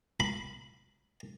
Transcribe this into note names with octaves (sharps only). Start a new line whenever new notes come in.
B5